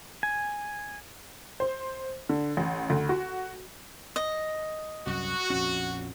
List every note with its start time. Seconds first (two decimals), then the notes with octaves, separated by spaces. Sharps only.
0.23 G#5
1.60 C5
2.29 D3
2.57 A1
2.90 D2
3.09 F#4
4.16 D#5
5.06 C2 F#2 F#4
5.50 A#1 F2 C#4